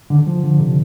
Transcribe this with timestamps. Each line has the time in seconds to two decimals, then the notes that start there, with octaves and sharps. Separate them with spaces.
0.10 D3
0.27 F3
0.43 D3
0.60 C3